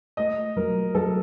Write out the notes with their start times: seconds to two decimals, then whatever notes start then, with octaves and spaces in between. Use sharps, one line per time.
0.17 A3 D#5
0.56 F#3 A#4
0.95 F#3 A4